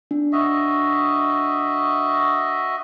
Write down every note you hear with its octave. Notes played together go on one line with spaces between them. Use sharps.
D4
F#4 D#5 E5